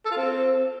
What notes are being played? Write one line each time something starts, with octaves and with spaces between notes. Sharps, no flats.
A4
F4
C4